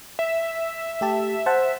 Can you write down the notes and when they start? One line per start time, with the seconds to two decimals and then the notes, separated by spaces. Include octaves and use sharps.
0.19 E5
1.01 A3 G4 A5
1.46 C5 F#5 A5